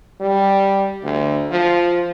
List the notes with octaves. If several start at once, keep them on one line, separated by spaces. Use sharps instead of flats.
G3
D2
F3